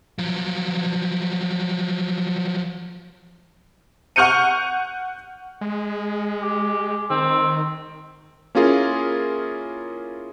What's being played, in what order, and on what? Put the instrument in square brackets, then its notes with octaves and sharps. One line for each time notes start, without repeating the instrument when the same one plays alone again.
[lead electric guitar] F3 F#3
[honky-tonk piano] F#5 C#6 F6 G6 C#7 D#7
[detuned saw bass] G#3
[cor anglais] G4
[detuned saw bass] D#3 [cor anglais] C4
[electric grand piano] A#3 C#4 E4 F4 G#4 A#4